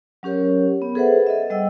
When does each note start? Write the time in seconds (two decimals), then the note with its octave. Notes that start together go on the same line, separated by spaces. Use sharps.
0.23 F#3 C#4 G4 A#4 C#5
0.82 B3
0.95 G#4 A4 B4 C5 E5 F#5
1.27 A4 D#5 E5
1.50 G3 D#5 F#5 G5 E6